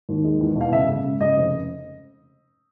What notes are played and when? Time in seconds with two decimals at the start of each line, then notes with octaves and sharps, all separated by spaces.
0.09 D#2
0.24 G#3
0.40 E2
0.55 B2
0.61 F5
0.72 C#3 E5
0.89 C#3
1.04 C#3
1.21 C#3 D#5
1.37 F1